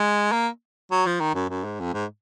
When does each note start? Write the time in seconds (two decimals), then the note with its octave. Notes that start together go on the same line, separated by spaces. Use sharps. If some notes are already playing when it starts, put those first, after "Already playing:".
Already playing: G#3
0.32 A#3
0.91 F#3
1.06 F3
1.20 D#3
1.35 F#2
1.50 F#2
1.65 G#2
1.80 F2
1.94 G#2